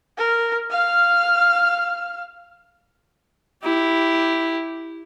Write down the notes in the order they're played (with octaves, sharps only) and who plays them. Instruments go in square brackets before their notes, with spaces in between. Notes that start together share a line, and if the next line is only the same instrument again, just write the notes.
[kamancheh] A#4
F5 F6
[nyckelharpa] E4 G4